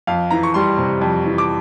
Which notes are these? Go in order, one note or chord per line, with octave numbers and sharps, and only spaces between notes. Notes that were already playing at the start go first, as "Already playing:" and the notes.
F2 F5
E3 A#5
C#6
G3 C6
C3
F2
E3
D6